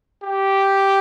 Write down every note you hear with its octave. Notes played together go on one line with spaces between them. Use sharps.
G4